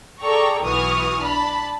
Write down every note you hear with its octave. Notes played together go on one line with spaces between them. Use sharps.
G#4 A4 D5 G5 A#5 C#6
B1 E3 F#4 C#6 D#6 F6
D4 A5 B5